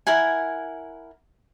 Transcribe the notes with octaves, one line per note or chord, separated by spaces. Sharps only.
E4 A#4 F#5 G#5